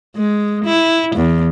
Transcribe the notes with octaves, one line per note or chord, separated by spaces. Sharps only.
G#3
E4
E2